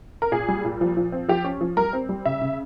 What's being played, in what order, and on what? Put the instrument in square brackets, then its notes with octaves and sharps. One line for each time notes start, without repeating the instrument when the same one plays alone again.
[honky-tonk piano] A#4
A#2 G#4
G3
A#2
F3
F3
C4
F3 G4
C#4
F3
G3 A#4
C4
G3
C#3 E5
C#3